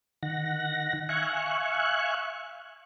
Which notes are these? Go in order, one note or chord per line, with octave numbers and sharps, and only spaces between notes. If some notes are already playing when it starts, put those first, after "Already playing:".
D#3 F#5 A#6
E5 F5 G#5 C#6 F#6